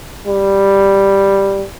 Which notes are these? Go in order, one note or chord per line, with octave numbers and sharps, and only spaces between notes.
G3